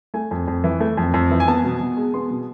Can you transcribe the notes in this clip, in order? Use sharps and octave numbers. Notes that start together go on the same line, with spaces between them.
A3 G#5
F2
F2
E3
A3
F2
F2
E3
G#5
B3 A5
B2
B2
G#3
B3 C6
B2